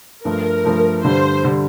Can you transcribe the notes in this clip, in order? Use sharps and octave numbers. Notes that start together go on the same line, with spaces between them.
G2 F3 A3 A#4
G2 F3 A3
G2 D3 G3 C5
D3 G3